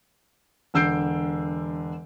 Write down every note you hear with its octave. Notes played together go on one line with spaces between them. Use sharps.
E1 D3 E6 G6 C7 D7